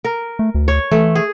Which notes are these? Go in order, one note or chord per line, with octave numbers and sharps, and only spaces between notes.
A#4
A3
D2
C#5
E3 A3
G#4